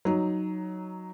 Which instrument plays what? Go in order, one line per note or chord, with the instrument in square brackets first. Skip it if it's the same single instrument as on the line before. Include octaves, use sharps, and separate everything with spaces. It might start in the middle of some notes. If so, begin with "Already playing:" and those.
[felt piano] F#3 D#4